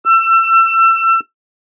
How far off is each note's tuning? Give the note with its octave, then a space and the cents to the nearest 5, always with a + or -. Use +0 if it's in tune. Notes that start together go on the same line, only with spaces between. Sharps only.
E6 +30